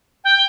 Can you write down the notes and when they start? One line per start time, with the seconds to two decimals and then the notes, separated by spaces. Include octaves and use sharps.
0.24 G5